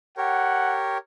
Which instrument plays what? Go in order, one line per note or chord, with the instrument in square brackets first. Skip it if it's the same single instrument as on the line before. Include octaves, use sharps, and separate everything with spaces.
[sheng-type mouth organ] G4 A#4 C#5 [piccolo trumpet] F#5